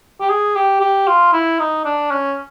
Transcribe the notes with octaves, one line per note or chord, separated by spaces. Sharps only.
G4
G#4
G4
G4
F4
E4
D#4
D4
C#4